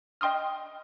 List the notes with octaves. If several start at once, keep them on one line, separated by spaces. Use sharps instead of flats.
D#5 G5 C6 D#6 F6